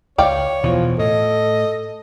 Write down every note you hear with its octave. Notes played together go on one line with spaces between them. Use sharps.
C#2 C#5 D5 F5 G5
E1 B2 E3 F3
A2 A4 D#5